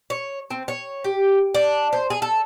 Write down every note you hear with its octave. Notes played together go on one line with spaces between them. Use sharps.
C#5
C4
C#5
G4
D4
C5
G#4
A4